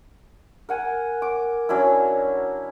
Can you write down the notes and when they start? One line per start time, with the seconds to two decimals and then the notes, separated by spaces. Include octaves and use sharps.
0.69 A#4 F#5 G#5
1.22 D6
1.69 F#3 C#4 D4 E4